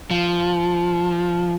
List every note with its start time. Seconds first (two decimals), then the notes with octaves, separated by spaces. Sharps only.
0.11 F3